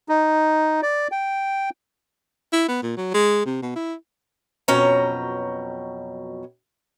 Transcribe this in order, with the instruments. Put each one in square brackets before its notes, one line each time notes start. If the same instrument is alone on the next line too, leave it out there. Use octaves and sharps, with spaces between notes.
[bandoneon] D#4
D5
G5
[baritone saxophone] E4
B3
A#2
F#3
G#3
C3
B2
E4
[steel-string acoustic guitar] F2 B2 F#3 C#4 G5 A#5